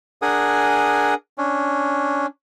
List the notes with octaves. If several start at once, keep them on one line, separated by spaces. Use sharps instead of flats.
D4 G#4 A#4 F#5 G#5 D#6
C#4 D4